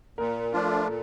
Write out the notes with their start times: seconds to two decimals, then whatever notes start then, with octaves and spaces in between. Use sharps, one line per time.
0.18 A#2 A#4
0.52 F3 A3 D4 F4
0.87 A#2 A4